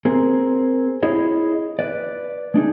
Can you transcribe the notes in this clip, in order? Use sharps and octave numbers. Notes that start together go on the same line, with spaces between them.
C4 G#4 A#4
E4 G#4 C#5 D#5
B4 D5
G#3 D4 D#4 G#4